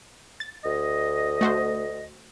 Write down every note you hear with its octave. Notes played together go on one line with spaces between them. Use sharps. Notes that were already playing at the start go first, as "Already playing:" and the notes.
A6
D2 D#5
A3 F#4 C5